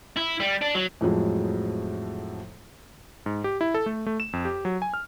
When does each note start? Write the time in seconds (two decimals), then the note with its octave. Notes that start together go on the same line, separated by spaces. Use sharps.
0.16 E4
0.40 G3
0.61 D4
0.75 F#3
1.01 F2 A2 F3 F#3 G#3
3.26 G#2
3.44 G4
3.61 E4
3.74 A4
3.86 A3
4.06 A3
4.20 E7
4.33 F2
4.45 G4
4.65 F#3
4.82 G#5
4.94 F6